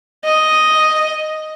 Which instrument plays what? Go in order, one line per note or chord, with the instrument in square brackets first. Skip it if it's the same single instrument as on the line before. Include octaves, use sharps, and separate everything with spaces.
[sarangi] D#5